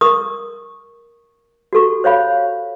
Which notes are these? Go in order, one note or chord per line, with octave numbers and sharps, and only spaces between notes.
A#4 C#6 D#6
F#4 G4 A4 C#6
C5 C#5 F5 B5